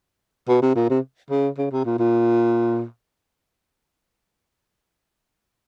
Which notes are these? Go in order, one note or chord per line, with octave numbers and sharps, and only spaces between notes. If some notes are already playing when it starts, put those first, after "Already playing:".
B2
C3
A#2
C3
C#3
C#3
C3
A#2
A#2